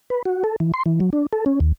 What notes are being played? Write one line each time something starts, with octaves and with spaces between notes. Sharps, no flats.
B4
F#4
A4
E3
C6
E3
F#3
D4
A4
C#4
D#2